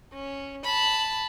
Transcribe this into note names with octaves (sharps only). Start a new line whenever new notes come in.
C#4
A5 B5